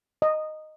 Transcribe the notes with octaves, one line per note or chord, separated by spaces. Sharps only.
D#5